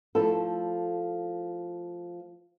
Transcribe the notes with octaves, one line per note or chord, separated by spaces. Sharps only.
F3 A3 E4 A4